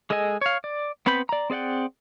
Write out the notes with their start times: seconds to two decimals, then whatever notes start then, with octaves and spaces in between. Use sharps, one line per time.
0.10 G#3 G#4 A4 D#5 G#5
0.41 C#5 F5
0.64 D5
1.06 B3 C4 B4 B5 G6
1.29 D5 A#5
1.50 C4 G#4 D5 F#5 G5